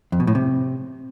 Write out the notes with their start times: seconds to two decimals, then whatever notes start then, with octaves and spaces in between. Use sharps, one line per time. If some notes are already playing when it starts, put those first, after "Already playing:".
0.12 F2
0.20 B2
0.27 A2
0.35 C3